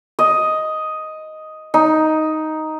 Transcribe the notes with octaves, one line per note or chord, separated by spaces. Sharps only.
D#5
D#4